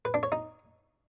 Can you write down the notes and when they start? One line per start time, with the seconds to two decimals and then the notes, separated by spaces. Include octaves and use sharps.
0.05 B4
0.14 D4
0.23 C#5
0.32 D#4